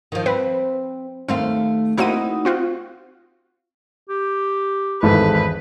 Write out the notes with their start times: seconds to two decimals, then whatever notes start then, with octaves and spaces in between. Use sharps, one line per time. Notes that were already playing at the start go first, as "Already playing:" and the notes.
0.12 D#3 F3
0.26 C4 B4
1.28 D#2 A3 C4 F5
1.98 A#3 C4 D#4 E4 F#4 D#7
2.45 C4 F4 F#4
4.09 G4
5.03 G#1 E2 D#3 G#3 A4 B4